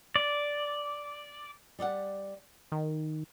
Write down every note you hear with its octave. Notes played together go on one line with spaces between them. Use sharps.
D5
G3 D5 D#5 F#5
D#3